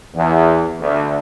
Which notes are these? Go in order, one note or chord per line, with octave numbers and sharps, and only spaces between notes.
E2
D2